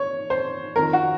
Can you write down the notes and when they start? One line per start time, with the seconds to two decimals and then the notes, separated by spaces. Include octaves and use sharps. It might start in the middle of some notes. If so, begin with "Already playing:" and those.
Already playing: C#5
0.30 C5
0.76 F2 D#3 A#4
0.93 F#4